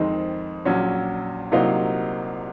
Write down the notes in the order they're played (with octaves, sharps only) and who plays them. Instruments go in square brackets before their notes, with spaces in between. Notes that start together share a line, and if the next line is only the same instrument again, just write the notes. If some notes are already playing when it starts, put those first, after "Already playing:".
Already playing: [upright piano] F2 D#3 G#3 C4 D#4 C5
A#1 A#2 F#3 C#4 C#5
C2 C3 F#3 A#3 D#4 F4 F5